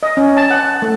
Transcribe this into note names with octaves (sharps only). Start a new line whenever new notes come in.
D#5
C#4
A5
F#5
A3